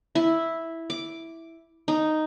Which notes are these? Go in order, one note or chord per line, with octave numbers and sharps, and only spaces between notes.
E4
D6
D#4